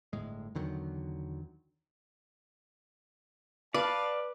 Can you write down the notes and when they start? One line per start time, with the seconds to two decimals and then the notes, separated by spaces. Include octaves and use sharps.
0.13 G1 A2 G#3
0.55 E2 D3 D#3 F#3
3.74 B4 D5 F5 A5